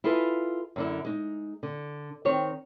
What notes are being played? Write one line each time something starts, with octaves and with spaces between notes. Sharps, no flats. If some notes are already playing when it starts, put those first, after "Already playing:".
E4 F4 G#4 A4 B4
F#2 D3 E4
G#3 D#4
D3
D#3 C4 C#5